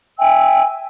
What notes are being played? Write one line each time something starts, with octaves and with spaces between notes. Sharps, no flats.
E5 G5 G#5 E6